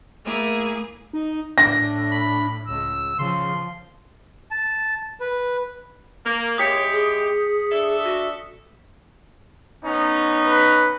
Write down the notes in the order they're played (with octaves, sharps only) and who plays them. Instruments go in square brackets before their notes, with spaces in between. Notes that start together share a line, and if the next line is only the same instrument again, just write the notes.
[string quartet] A3 A#3 E4 G#4
[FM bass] D#4
[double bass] A2 [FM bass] D4 [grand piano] A#6
[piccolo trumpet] B5
[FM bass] C#2 [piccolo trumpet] E6
[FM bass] C#3 [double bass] F3 [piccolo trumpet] C6
[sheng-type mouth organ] A5
B4
[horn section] A#3
[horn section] G#3 E4 G4 [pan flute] C#5 [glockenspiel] D#6 B6 C#7
[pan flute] G#4
[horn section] D4 A4 E5
[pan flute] F#4
[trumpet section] B3 C#4 D#4
[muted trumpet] B4